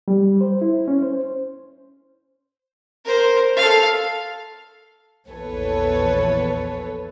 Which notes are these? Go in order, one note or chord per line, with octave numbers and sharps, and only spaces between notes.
G3
C5
E4
C#4
C5
A#4 C5
A4 F5
A#1 E2 A4 B4 C#5